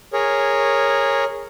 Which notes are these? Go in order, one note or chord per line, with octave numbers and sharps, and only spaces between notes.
G#4 A#4 C#5